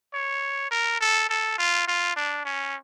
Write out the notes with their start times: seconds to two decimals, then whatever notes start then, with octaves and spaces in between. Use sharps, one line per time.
0.14 C#5
0.71 A#4
1.00 A4
1.29 A4
1.58 F4
1.87 F4
2.16 D4
2.45 C#4